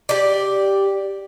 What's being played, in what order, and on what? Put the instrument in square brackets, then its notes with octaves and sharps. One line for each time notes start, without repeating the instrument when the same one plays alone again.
[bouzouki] G4 D5